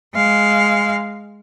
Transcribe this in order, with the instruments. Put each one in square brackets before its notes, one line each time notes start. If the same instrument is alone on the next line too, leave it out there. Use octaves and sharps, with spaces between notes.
[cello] G#3 F5